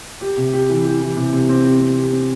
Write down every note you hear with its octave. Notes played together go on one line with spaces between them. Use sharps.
G4
C3
G4
E3
G4
E3
C3
C3
C4
G4
C4
G4
C4